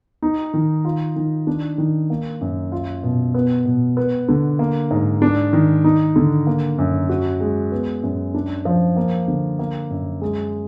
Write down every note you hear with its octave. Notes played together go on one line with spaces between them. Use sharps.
D#4
D#3
F4
D#3
D4
D#3
A#3
F#2
F4
B2
B3
B2
B3
D3
A#3
G#2
D4
D#3
D#4
D3
A#3
F#2
F#4
G#3
B3
F#2
D4
F3
A#3
D3
A#3
F#2
G#3